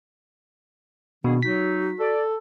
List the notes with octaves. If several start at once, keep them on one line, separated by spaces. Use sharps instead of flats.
B2 D#3 A#3 D4 G#4
F#3 D#4 F#4 B6
A4 D5